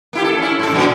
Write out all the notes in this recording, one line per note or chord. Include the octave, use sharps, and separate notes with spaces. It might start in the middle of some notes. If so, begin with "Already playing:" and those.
A#3 E4 G4
A4
C#4 E4
G#2 A4
A#2 D3 F#3